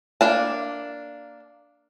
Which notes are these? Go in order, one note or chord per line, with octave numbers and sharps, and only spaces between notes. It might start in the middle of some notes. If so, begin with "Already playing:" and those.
A#3 D4 A5